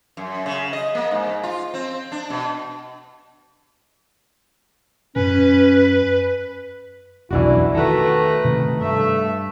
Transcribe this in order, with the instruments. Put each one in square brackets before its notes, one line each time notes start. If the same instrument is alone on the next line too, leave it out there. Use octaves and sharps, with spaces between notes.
[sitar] F#2
C#3
D#5
A#3
G#2
F4
C4
D4
B2
[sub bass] F#2 [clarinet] C#4 [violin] B4
[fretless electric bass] F1 B1 E2 [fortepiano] E3 D4 F#4 [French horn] E4
[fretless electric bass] D#3 [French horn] A3 [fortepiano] F#4 A4 [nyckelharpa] B4 A#5
[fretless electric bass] C3 D#3 A3
[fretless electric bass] G2 [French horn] A3 [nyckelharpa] E5